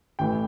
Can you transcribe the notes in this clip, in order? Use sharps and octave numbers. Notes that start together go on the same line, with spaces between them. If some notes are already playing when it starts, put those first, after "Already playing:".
A1 A2 E3 G5